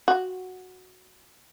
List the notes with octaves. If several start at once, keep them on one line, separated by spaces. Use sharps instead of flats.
F#4